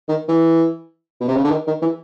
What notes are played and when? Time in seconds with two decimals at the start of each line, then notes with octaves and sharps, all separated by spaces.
0.08 D#3
0.28 E3
1.20 B2
1.28 C3
1.36 C#3
1.44 D3
1.51 D#3
1.67 D#3
1.82 E3